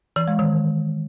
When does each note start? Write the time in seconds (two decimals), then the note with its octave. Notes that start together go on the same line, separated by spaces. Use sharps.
0.16 E3
0.28 G#3
0.39 D#3